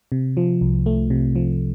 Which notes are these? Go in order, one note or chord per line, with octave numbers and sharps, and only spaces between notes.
C3
F3
C2
A3
C3
F3